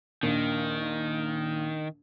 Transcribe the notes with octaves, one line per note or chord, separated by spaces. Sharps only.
A#1 D#2 D#3